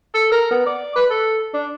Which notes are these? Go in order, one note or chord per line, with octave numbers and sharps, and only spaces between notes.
A4
A#4
B3
D5
B4
A4
D4